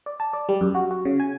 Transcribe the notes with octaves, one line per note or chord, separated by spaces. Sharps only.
D5
A5
D5
G3
F#2
F#4
F#4
C#3
G#5